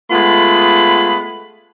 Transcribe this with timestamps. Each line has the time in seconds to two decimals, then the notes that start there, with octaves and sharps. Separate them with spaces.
0.12 G#3 A3 B3 F4 B5